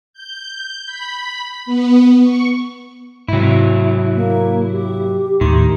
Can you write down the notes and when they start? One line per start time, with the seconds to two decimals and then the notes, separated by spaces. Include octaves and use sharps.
0.13 G6
0.86 B5
1.66 B3
2.21 C#6
3.28 G#2 C3 F#3 E4
4.15 A#3
4.72 G4
5.41 D#2 A2 D#3 C6